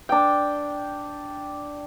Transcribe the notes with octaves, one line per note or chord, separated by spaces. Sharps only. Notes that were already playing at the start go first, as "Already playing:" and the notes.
D4 G5